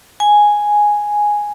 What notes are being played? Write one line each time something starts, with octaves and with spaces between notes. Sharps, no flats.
G#5